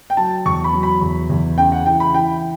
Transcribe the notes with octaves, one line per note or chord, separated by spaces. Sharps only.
G5
F#3 A5
E2 C#6
B5
F#3
B5
E2
E2
C#3 G5
F#5
E3 G5
B5
E3 G5